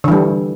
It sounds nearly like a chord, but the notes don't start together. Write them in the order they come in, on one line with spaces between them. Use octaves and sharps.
D3 E3 G3